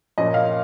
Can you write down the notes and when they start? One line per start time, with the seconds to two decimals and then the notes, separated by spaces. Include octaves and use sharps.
0.18 A#2 F3 A#3 C#4 D#5
0.34 F5